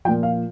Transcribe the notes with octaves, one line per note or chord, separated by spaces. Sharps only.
A#2 F3 G5
F5